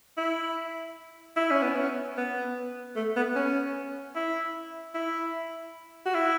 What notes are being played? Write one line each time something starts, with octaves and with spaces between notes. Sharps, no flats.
E4
E4
C#4
B3
C#4
B3
A3
B3
C#4
E4
E4
F#4
E4